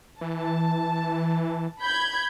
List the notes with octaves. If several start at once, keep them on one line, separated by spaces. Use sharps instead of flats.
E3 A5
B5 G6 G#6